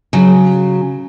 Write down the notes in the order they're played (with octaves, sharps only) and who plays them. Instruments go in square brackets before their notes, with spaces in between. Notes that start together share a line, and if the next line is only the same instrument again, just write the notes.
[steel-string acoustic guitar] C#3 F#3